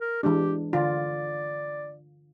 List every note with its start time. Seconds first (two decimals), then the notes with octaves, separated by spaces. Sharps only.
0.01 A#4
0.23 E3 G#3 D4 G4
0.73 D3 F4 D5